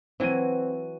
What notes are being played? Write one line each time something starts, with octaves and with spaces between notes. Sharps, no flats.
E3 F#3 C4 D#7